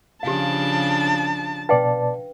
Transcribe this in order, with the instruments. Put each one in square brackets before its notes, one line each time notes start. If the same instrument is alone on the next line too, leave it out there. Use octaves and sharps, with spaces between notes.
[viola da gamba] C#3 F3 D4 [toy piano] G4 F5 [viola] A5
[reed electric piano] B2 D5 A5 [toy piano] B4 F5 G5